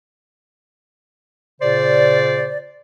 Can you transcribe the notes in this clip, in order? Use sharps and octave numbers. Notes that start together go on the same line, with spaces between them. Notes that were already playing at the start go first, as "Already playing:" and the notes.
A#2 C#3 C5 D5